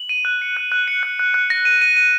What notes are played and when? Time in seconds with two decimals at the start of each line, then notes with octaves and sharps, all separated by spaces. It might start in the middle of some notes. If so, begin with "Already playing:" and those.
Already playing: F#7
0.09 D#7
0.25 F#6
0.42 C#7
0.57 F#6
0.72 F#6
0.88 C#7
1.03 F#6
1.19 F#6
1.34 F#6
1.50 A#6
1.65 D#7
1.82 D#7
1.97 D#7